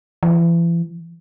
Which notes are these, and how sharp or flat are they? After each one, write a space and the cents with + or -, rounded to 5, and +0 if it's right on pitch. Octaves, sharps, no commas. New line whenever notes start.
E3 +40